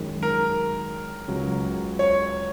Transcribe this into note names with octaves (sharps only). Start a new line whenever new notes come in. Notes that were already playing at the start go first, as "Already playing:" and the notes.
Already playing: F#2 D#3 G#3
A#4
C#2 C#3 F#3
C#5